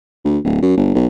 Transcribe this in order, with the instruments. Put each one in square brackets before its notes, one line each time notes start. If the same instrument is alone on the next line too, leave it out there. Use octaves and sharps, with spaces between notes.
[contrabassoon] D2
D1
F#2
G1
B1